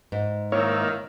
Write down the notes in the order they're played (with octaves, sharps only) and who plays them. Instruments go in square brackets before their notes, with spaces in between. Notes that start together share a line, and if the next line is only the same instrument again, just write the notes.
[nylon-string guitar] G#2
[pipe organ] D#3 [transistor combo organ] A#3 E4 F5 [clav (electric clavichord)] C#5